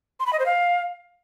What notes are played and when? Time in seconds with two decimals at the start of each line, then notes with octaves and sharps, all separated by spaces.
0.20 C6
0.26 B5
0.33 D#5
0.39 C5
0.46 F5